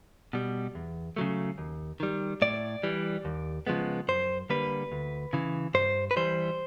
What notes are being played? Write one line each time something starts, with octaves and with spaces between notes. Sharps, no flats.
B2 G3
E2
C#3 F#3 A3
D#2
D#3 G3
A2 D5
E3 G3
D#2
C#3 F3 G#3 B3
F#2 C5
D3 G3 A#3 B4
D2
C#3 E3
G2 C5
B4
E3 G3 C5